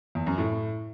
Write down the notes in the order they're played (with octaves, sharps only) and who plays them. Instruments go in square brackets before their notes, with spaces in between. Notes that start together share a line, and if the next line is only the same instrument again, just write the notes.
[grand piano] E2
F#2
A2